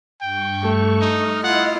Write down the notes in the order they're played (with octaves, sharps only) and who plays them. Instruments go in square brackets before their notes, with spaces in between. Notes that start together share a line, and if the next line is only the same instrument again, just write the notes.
[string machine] G2 C#6 [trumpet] G5
[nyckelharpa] A3
[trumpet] D#4 [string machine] D#5 F6
[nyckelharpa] E4 F4 [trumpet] F#5